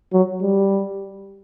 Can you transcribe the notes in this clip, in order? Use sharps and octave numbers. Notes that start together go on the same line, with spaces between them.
F#3
G3